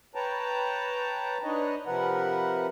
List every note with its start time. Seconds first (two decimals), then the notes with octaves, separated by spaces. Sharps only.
0.15 B4 C#5 G5 A5 A#5
1.44 D4 D#4 B4 C#5 D#5
1.87 C3 F3 A#4 B4 F#5